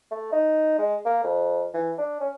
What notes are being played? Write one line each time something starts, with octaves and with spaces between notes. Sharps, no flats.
A3
D#4
G#3
A#3
F2
E3
D4
C#4